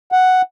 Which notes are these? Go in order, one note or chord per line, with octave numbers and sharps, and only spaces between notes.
F#5